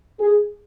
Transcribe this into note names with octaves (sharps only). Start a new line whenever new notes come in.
G#4